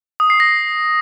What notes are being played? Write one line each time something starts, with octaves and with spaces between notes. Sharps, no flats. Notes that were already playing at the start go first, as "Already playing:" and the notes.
D#6
C7
A#6